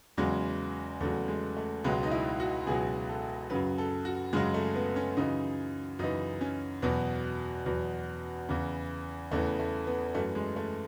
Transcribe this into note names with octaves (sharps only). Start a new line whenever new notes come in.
E2 C#3 F#3 G#3
E2 C#3 F#3 A3
G#3
A3
C#2 B2 F#3 G#3
D#4
E4
F#4
C#2 B2 F#3 G#4
A4
F#2 C#3 F#3 B4
A4
F#4
F#2 C#3 F#3 G#3
A3
B3
C#4
F#2 C#3 E3 D#4
F#2 C#3 E3 D#4
C#4
E2 B2 F#3 B3
E2 B2 F#3
E2 C#3 E3
E2 C#3 E3 A3
A3
B3
F#2 E3 A3
G#3
A3